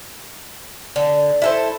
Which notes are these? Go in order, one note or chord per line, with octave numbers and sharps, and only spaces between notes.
D3
E4 A4 C5